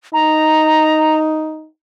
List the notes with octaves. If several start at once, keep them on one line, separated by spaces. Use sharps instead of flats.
D#4 A#5